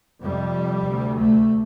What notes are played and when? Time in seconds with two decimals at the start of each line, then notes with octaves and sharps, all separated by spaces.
0.23 F2 C3 G3
0.87 D2 C3
1.19 A3